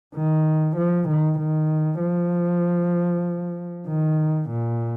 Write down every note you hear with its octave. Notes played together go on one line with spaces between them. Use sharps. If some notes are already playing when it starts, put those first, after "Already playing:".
D#3
F3
D#3
D#3
F3
D#3
A#2